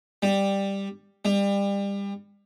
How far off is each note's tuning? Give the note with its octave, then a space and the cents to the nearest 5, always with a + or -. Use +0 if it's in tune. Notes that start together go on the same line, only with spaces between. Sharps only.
G3 +10
G3 +30